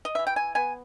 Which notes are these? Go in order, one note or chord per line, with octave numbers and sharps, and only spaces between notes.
D#5
E3 E5
G5
G#5
B3 G#5